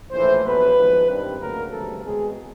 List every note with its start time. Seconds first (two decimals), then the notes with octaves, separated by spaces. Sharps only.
0.11 A#1 A2 E3 A3 C5
0.43 A#1 A2 F#3 B3 B4
0.76 G#1 G#2 F3
1.08 G2 D#3 G3 C4
1.39 D2 C#3 F#3 A#3 A#4
1.71 D2 C#3 E3 G3 C4 A4
2.04 E2 B2 G#3 C4 G#4